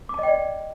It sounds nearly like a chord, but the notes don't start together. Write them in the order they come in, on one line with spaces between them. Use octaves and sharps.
D6 A5 D#5 G5 D5